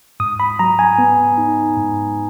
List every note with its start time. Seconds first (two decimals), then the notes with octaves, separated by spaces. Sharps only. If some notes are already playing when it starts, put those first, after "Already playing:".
0.20 G#2 D#6
0.40 B5
0.59 F#3 A#5
0.79 G#5
0.98 B3
1.38 D#4
1.77 G#2